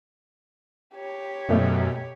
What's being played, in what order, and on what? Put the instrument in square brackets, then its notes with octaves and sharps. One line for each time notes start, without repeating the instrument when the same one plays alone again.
[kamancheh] G4 C#5
[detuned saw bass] F#2 [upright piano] B2 A3